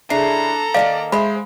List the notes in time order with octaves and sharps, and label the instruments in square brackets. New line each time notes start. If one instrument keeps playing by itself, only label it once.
[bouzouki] C#3 E4 [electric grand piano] D4 C7 [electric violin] A4 A#5
[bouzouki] D#3 G3 A#3 [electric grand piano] D5 [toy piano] F5
[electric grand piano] G#3 [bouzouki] C5 E5 [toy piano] B5